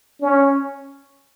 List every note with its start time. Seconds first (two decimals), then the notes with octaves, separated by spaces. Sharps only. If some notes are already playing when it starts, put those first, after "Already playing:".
0.21 C#4